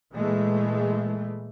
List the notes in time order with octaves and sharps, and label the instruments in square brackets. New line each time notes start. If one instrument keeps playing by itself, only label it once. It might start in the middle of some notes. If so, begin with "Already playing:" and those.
[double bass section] A#2 E3 G#3 A3